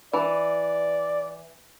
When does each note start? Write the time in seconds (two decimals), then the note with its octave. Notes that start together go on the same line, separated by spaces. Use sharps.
0.13 E3 D5